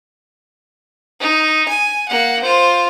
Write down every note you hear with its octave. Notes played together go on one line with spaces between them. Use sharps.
D#4
G#5
A#3 F#5
F4 C5